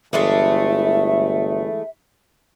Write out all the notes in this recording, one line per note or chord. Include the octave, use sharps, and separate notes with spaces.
G1 E3 G#3 A3 E5